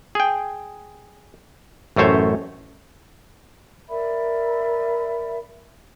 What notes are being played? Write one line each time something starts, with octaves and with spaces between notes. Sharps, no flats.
G#4 G5
A1 F#2 A3 C5 C#5
A#4 D5 E5 B5